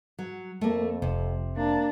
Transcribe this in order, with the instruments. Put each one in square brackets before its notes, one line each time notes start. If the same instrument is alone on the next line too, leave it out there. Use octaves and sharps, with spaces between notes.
[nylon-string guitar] F#3
[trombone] F2 [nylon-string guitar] A3 A#3
[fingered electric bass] F1 [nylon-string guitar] C3
[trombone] A#3 [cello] D4